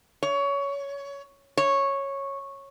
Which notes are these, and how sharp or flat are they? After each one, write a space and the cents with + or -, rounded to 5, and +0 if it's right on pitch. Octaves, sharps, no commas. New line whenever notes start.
C#5 +20
C#5 -10